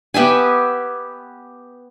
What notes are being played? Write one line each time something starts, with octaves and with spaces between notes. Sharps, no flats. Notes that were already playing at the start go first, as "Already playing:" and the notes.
B3 G4 E5 G#5